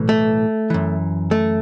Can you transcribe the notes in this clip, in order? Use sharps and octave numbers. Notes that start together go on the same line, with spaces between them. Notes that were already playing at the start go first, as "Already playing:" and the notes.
Already playing: B1 A2 E3
A3
F#2 E3
A3